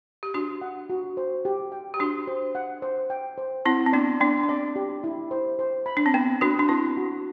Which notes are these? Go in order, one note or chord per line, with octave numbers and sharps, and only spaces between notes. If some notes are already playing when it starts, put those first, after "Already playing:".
G4
D4 F#4 C6
F#5
F#4
C5
G4
G5
G4
D4 F#4 C6
C5
F#5
C5
G5
C5
C4 E4 F#5
C4
B3 D4 D5
B3 D4 D5
D4
C4 D5
G4
E4
C5
C5
B5
D4
C4
B3 B4
D4 F#4 B4
D4
C4 E4 B4
F#4